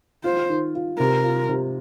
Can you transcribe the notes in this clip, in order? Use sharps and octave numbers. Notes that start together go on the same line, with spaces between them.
F4 C5
D#3
F4
C3 A#4
F4
C3